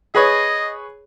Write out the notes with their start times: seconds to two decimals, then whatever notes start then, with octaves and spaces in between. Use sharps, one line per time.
0.15 G#4 B4 C#5 D#5